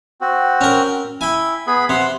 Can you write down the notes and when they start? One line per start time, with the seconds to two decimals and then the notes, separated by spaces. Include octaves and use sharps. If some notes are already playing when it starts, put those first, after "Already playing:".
0.21 C4 F#4
0.61 C#4 A#4
1.21 E4 G5 G#5
1.67 B3 G#4 B5
1.89 C3 F#5 C6